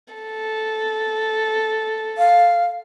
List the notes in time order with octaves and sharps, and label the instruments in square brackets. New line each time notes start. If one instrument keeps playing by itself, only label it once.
[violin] A4
[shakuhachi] F5